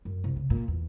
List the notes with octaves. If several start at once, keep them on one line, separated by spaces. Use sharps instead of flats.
F#2
C2
C#3
A#2
E2